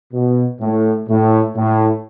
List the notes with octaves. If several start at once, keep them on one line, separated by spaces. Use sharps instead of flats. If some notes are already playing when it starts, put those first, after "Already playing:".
B2
A2
A2
A2